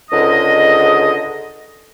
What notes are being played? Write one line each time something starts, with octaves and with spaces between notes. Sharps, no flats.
C#2 G#2 D3 D#5